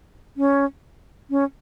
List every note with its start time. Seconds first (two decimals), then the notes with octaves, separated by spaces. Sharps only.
0.37 C#4
1.30 C#4